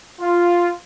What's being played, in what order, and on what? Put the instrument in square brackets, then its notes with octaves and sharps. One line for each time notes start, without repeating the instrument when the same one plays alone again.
[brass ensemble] F4